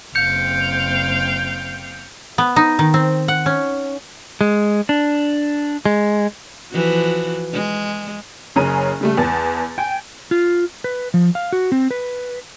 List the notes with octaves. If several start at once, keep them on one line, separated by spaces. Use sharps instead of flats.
F#1 C4 F5 G5 G6 C#7
B3
D#4
D#3
C4
F#5
C#4
G#3
D4
G#3
E3 F3 F#4
G#3
F#1 C#3 C#4 G#4 A#5 D#7
C#3 G3 A3
E2 B3 A5 A6
G5 G#5
F4
B4
F3
F5
F#4
C4
B4